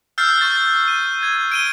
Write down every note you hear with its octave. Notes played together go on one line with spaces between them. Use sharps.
E6 F6 G6 A6 C7
C#6 A6
D#7
G#6
D7 D#7 G7